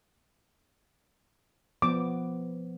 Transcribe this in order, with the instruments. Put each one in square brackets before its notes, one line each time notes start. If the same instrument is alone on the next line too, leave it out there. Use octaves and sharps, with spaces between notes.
[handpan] F3 B3 [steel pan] D6